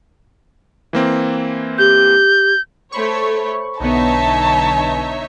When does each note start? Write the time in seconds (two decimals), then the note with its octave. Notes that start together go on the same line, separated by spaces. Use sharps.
0.93 E3 A#3 C4
1.78 G4 G6
2.92 A3 C5 C#5 B5 C#6
3.80 B1 D3 B3 D#4 C#5 E5 A5